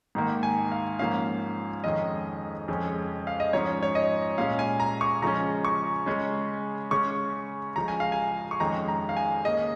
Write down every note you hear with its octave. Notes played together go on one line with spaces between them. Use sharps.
G#2 D#3 A#3
G#5
F5
G#2 F3 A#3 C#4 F5
F2 D#3 G#3 C#4 D#5
F2 C#3 G#3 C#4
F5
D#5
G#2 F3 C#4 C#5
C#5
D#5
A#2 G#3 C#4 F5
G#5
A#5
C#6
C#3 F3 G#3 C#4 A#5
C#6
C#3 G#3 C#4
C#3 G#3 C#4 C#6
C#3 F3 G#3 A#5
G#5
F5
G#5
C#6
F2 D#3 G#3 C#4 A#5
A#5
F5
G#5
C#3 A#3 C#4 D#5